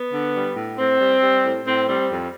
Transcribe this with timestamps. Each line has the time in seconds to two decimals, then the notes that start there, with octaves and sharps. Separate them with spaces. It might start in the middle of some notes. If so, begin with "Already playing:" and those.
Already playing: B3
0.12 D3
0.34 G3
0.56 A2
0.78 A2 C4
1.00 G3
1.21 G3
1.44 A2
1.65 A2 C4
1.87 G3 C4
2.09 F2